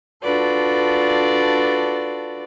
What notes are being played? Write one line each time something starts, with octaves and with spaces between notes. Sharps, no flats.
D4 F4 F#4 A4 B4 D5